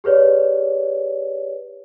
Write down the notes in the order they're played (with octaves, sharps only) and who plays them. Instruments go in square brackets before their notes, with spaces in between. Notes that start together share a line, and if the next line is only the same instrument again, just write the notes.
[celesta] G4 G#4 B4 C#5 D5